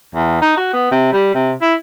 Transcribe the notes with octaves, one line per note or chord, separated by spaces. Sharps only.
E2
D#4
F#4
B3
C3
G3
C3
E4